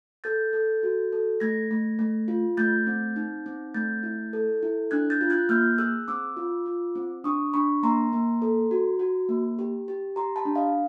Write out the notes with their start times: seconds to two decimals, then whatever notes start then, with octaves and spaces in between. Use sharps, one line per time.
0.24 A4 G6 A6
0.53 A4
0.83 F#4
1.12 A4
1.40 A3 G#6 A#6
1.71 A3
1.99 A3
2.28 F4
2.57 A3 G6 A6
2.87 C4
3.16 D#4
3.46 C4
3.74 A3 G6 A6
4.03 E4
4.33 A4
4.63 E4
4.91 D4 F#6 G#6
5.10 G6 A6
5.21 F4
5.30 F#6 G#6
5.49 A#3 F6 G6
5.78 G#4 E6 F#6
6.08 C4 D6 E6
6.37 F4
6.66 F4
6.95 C4
7.24 D4 C#6 D#6
7.54 D4 B5 C#6
7.83 A#3 A#5 C6
8.13 A#3
8.42 A4
8.71 F#4
8.99 F#4
9.29 A#3
9.59 G4
9.88 G4
10.16 G4 A#5 C6
10.36 A5 B5
10.46 D4
10.55 D#5 F5